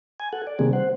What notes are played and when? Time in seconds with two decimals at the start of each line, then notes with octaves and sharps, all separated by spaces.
0.20 G#5
0.33 A4 F#5
0.47 D5
0.59 C3 D#3 G3 A#3 C4 G#4
0.73 C5 F#5